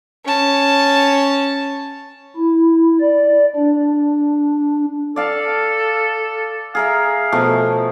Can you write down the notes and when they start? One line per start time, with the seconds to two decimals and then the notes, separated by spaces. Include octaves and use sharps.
0.25 C#4 A5
2.36 E4
3.00 D5
3.56 D4
5.16 A4 D5 F5 A5
6.75 G#4 A#4 E5 F5
7.32 B2 F3 A3